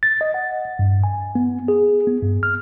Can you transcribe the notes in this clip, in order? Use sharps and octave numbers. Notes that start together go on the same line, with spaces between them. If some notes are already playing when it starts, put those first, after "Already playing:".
A6
D#5
F#5
G2
G#5
B3
G#4
B3
G2
F6